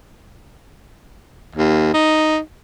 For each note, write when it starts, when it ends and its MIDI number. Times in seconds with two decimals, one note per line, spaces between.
1.55 1.90 39
1.94 2.38 63